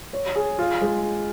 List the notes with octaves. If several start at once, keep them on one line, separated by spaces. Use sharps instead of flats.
C#5
G#4
F4
G#3